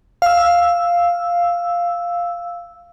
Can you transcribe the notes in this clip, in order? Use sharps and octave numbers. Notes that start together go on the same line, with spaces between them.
F5 E6